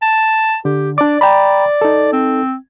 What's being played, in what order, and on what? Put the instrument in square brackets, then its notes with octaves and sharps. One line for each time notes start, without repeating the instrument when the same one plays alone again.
[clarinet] A5
[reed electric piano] D3 [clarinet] G4
[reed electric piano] D4 D6 [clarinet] D5
[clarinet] D5 [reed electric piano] G5 A#5 B5
[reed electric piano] D#4 A4
[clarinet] C4